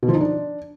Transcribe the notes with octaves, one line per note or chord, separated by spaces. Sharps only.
B2
F3
D#4
D4